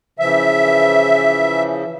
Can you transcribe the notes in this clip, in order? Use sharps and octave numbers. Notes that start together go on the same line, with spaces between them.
C#3 E3 F3 E5